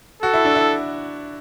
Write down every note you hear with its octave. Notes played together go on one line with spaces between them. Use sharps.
F#4 A4
E4
D4
E4